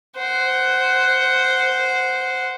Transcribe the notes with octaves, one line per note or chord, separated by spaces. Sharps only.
C5 F#5